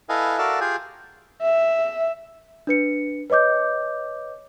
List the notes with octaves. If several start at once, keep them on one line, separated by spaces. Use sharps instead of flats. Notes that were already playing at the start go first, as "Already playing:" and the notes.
E4 A4 B4 D#5 F5 G#5
F#4 A4 A#4 D5 E5 F5
F4 G4 G#4 G#5
E5
D4 B4 C#7
B4 C#5 D#5 D6 G6